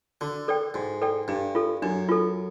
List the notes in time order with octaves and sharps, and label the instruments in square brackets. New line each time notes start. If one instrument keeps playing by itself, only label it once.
[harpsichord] D3 [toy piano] F#4
[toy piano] A4 D5 G5
[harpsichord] G#2 [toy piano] F#4
[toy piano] A4 D5 G5
[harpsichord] G2 [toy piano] D4
[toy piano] F4 A4
[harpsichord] F#2 [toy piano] D4
[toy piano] F4 A4